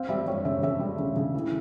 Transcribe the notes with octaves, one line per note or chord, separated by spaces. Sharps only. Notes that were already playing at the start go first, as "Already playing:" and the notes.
Already playing: C4 F5
G3 E5
G3 C#5
C#3 E5
C#3 E5
G3
C#3
C#3
E3